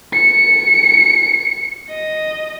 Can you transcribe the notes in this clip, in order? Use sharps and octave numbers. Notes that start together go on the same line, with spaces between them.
C#7
D#5